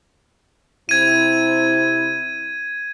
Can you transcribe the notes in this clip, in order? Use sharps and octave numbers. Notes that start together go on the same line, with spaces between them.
C3 C4 E4 G#6 D#7